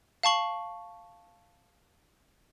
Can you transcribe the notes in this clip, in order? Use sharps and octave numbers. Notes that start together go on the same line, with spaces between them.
F5 A5 C#6 F#7